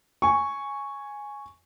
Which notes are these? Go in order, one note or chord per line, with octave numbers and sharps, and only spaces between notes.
G#5 C#6